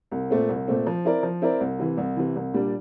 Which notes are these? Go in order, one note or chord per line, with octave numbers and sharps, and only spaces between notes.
C2
A#2 A3 C4
C2
A#2 A3 C4
F3
C4 E4 A#4 D5
F3
C4 E4 A#4 D5
C2
C3 E3
C2
C3 E3
C2
A#2 G3 D4